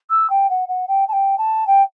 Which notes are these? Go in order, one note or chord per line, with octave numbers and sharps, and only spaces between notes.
E6
G5
F#5
F#5
G5
A5
G5
A5
G5